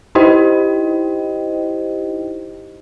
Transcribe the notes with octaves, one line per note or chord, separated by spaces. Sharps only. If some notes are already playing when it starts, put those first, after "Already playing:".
D#4 E4 G4 C5 D#5 G5